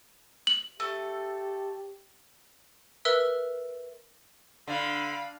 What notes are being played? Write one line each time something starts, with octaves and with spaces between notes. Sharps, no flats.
F#7
A3 G4 A4
A#4 B4 E5 E6
D3 F5 B5